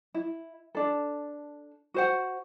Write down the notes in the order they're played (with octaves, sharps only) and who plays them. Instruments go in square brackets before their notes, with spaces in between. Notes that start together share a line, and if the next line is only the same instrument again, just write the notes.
[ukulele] E4
D4 A4
F#4 C5 F#5